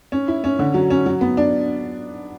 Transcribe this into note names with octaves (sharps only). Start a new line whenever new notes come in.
C#4
E4
C#4
D3
F#3
C#4
F#3
B3
D4